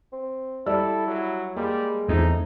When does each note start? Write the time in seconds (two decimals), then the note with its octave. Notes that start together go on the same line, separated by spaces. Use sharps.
0.13 C4
0.66 G3 E4 A4 D5 E6
1.07 F#3
1.56 G3 G#3 A#3
2.08 E2 A3 C4 D#4